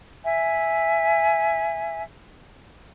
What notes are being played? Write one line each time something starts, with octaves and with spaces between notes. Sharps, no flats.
E5 G#5